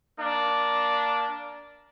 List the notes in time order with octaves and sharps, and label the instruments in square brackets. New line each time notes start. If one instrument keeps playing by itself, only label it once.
[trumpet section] A#3 D4